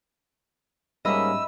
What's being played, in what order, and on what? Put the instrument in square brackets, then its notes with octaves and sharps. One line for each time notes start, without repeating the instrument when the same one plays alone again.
[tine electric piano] G#2 A#3 C#4 [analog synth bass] G3 [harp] D#5 E5 B5 [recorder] E6